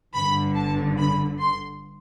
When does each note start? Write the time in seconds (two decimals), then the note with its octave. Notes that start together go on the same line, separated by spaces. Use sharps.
0.14 G1 G2 D3 B5
0.56 A5
0.98 B5
1.39 C6